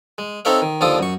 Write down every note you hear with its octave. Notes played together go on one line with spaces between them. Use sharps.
G#3
C4 D#4 A4 C#5 E5 F5
D#3
D#2 D3 F3 F4 A4 D#6
F#2 C#6